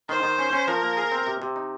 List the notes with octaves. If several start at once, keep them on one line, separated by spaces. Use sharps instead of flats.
D#3 C5
D#3
C#4
C#4
F3 A#4
A#3
G#4
C4
C3
C3
D#4